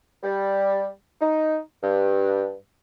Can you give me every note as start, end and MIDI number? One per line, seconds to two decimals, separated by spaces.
0.23 0.88 55
1.21 1.59 63
1.83 2.54 43